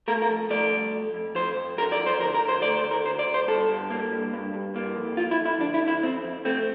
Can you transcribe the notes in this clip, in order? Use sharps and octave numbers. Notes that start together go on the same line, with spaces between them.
A3 A#4
A#4
F2
A3 D5
C2
F2
F2
F2 C5
F2
F2 A#4
D5
F2
C5
D2 A#4
A#4
D2
C5
A3 D5
C5
D2
A#4
D2 C5
D5
D2
C5
G2 A4
G2
A#3
G2
G2
G2
A#3
F2
F2 F4
E4
F2
E4
D2 D4
E4
D2
E4
F2 C4
F2
A3 C4